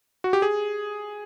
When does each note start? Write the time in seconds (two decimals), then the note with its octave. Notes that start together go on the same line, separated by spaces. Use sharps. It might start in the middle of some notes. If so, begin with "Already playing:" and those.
0.24 F#4
0.33 G4
0.42 G#4